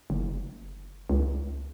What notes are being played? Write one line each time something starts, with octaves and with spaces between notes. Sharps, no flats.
F#1
C#2